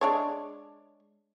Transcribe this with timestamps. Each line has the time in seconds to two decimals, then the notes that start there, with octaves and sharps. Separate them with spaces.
0.01 G#3 D4 C#5